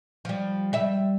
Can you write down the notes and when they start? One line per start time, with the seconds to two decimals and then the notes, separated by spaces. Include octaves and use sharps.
0.25 F3 G3
0.73 G3 E5